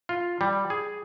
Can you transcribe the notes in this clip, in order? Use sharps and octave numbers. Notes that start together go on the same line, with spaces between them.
F4
G3
G#4